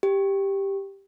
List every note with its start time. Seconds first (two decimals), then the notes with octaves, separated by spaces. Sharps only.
0.03 G4